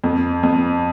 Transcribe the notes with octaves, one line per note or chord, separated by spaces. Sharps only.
F2
F2